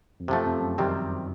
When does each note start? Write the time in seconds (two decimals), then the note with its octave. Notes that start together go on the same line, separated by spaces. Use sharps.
0.20 F2
0.28 F#2 C3
0.31 F3 A3
0.45 F2
0.61 F#2
0.78 C3 D#3 G3 C4